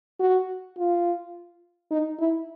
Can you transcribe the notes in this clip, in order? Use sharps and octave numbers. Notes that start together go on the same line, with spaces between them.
F#4
F4
D#4
E4